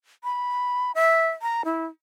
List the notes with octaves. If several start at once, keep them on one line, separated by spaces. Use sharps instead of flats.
B5
E5
A#5
E4